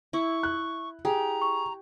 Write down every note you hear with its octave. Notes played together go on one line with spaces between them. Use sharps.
E4 C#6
F#6
G4 G#4 A#5
C#6